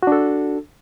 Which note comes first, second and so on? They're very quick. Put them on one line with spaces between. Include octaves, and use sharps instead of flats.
F#4 D4 A4